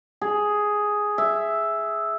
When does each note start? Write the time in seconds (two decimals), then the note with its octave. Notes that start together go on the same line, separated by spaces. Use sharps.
0.21 G#4
1.18 E5